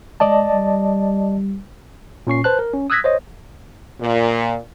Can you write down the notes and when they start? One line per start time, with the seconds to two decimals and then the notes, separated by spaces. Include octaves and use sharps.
0.20 G#3 D5 D#5 A5
0.53 G3
2.27 A#2 C#4 C#6 C7
2.44 B4 C5 A5 F#6
2.59 A#4
2.74 C#4
2.90 D#6 E6 F#6 G#6 A#6 B6
3.04 C5 C#5 D#5
4.00 A#2